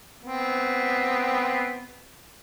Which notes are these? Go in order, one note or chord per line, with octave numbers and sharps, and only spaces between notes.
B3 C4